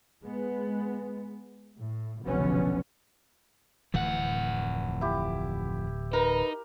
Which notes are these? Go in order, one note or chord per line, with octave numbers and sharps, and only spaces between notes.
G#3 B3
A2
F1 B1 D3 F#3 B3 C#4
D1 F2 A2 E3 F#5
E4 G4
D#4 A#4 B4